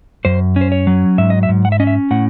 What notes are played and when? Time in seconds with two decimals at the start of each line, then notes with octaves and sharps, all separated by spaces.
0.25 F#2 C5
0.56 C#4
0.61 C5
0.72 C#5
0.87 F#3
1.18 G#2 E5
1.30 D#5
1.43 E5
1.49 G#2
1.65 F#5
1.72 E5
1.80 C#4 D#5
1.87 E5
2.11 A2 F#5